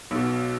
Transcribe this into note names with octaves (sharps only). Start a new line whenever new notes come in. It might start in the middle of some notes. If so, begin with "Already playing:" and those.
B1 B2